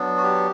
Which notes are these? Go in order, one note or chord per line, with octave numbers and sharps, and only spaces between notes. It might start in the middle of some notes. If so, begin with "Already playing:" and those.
Already playing: F#3 B3 D4
F#4
G4